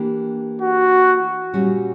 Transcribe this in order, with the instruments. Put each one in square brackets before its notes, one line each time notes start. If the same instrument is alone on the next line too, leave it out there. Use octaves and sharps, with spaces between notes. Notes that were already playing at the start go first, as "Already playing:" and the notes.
Already playing: [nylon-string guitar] E3 A#3 D4 G4
[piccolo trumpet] F#4
[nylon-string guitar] A#2 G3 C#4 F#4